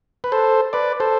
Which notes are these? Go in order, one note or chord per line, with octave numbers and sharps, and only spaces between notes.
B4
A4 C5
B4 D5
A4 C5